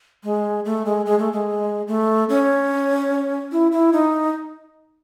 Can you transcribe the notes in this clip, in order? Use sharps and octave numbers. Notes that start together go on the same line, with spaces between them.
G#3
A3
G#3
G#3
A3
G#3
A3
C#4
E4
E4
D#4